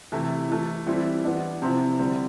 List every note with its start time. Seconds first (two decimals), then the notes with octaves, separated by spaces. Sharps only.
0.12 C3 E3 A3 E4
0.49 E3 A3 E4
0.86 E3 G3 C4 E4
1.24 E3 B3 D4
1.62 C3 F3 C4 E4
1.99 D3 G3 C4